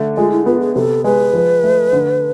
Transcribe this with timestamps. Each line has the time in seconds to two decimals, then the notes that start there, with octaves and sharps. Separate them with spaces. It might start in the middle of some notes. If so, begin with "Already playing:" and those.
Already playing: D3 A3
0.17 G#3 F4
0.31 E4
0.46 B3 F4
0.60 G#4
0.75 C3 A4
1.04 G#3 B4
1.34 F3
1.63 A3
1.93 D3